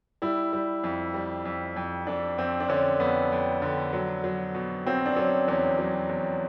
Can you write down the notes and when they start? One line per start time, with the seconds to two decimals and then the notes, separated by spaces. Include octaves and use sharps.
0.22 G3 E4
0.53 G3
0.84 F2
1.14 G3
1.45 F2
1.76 F2
2.07 F2 D4
2.38 F2 C4
2.60 D4
2.69 D3 C#4
3.00 F2 B3
3.32 F2
3.62 D3
3.93 F#3
4.24 F#3
4.55 B2
4.86 F#3 C4
5.06 D4
5.16 F#3 C#4
5.48 E2 C#4
5.79 F#3
6.09 E2